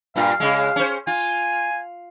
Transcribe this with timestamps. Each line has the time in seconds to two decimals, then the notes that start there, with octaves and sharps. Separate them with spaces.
0.16 G2 A#2 F4 F5
0.40 C#3 G#3
0.76 C#4 C5
1.07 F4 G#5